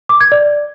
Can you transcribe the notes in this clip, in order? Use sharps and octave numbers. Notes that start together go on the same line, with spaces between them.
D6
G#6
D5